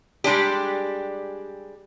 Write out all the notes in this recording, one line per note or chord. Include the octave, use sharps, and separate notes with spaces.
G3 G#3 D4 G4